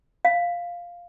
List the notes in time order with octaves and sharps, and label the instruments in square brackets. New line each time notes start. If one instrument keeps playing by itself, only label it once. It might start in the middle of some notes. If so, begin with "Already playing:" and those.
[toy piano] F5